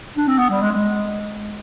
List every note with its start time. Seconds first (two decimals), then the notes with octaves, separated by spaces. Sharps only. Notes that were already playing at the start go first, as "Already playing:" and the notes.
0.17 D4
0.28 C4
0.38 B3
0.50 G3
0.61 G#3
0.72 G#3